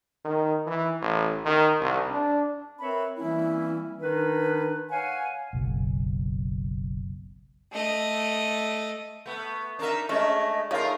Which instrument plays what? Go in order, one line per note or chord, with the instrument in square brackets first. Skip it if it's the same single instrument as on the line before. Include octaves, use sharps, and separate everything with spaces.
[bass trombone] D#3
E3
A1
D#3
C2
D4
[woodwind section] C4 A#4 B4 C#5 E5 B5
E3 G3 A#3 C4 C#4 E4
D#3 D4 D#4 B4
C#5 F5 F#5 G#5
[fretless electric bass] F#1 B1
[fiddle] A3 D#5
[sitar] A3 B3
[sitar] D4 D#4 E5 [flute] A#4
[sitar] G#3 C#4 D4 [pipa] A3 [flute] D#5
[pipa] C#3 A3 [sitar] D#4 F4 A#4 [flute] F5